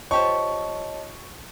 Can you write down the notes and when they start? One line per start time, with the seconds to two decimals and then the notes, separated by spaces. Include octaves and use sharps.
0.11 F4 G4 C5 C#5 D#5 A5 C#6